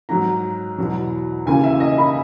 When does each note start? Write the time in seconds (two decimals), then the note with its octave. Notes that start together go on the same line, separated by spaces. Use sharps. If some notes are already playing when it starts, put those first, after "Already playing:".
0.09 G#2 F#3 A#5
0.78 E2 B2 F#3
1.46 D#2 C#3 E3 G#5
1.64 E5
1.80 D#5
1.98 B5